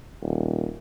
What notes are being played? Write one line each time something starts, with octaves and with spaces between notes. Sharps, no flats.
D#1